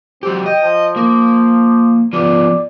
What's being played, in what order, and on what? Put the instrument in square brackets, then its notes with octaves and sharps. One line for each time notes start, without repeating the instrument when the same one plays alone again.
[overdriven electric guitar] F#3 G4 [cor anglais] C4
[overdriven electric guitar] D#5 [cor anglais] G5
[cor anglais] F3
[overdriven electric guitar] A#3
[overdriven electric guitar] F3 B3 [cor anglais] D5